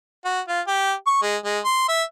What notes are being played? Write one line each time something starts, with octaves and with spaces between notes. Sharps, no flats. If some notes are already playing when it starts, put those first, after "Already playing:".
F#4
F4
G4
C#6
G#3
G#3
C6
E5